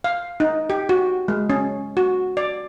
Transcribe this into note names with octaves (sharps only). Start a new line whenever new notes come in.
F5
D#4
G4
F#4
G#3
C#4
F#4
D5